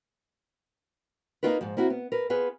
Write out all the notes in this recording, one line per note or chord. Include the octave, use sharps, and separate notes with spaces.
A#3 C#4 D#4 F4 A#4 B4
G#2 F3
A#3 C4 E4 F#4
B3
A#4 B4
B3 F4 G#4 B4